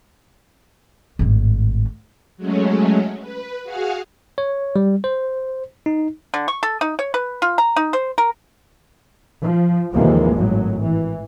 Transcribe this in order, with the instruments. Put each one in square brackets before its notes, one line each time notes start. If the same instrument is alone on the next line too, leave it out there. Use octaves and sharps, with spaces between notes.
[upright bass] G#1 A2
[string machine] F#3 G#3 A3 C#4
B4
F#4 G#4 F5 F#5 F6
[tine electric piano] C#5
G3
C5
D#4
[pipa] D3
C#6
A4
D#4
C#5
B4
F4
A#5
D#4
C5
A#4
[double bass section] F3
D#2 C3 E3 F3 G#3 A#3
G#1 A2 F#3
E3